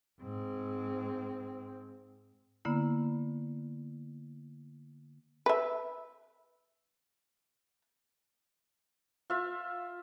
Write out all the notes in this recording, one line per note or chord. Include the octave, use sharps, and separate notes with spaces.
G#2 C4
D3 A#3 B3 E4
B4 E5
F4 E5